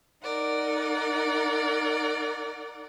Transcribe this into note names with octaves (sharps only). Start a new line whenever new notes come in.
D#4 A#4 D5 F#5